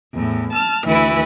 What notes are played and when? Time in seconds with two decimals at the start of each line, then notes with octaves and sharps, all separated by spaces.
0.13 E2 A2
0.51 A5 F6
0.85 D2 E3 E4 B4